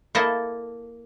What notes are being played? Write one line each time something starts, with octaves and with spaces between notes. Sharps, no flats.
A#3 E4 A4 D#5